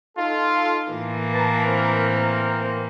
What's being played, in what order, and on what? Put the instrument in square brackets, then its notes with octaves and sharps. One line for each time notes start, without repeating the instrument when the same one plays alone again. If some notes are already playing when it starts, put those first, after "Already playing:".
[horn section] D#4 F4 A4
[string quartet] A2 E3 A#3
[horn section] B4 A5 A#5
C4 A#4 C5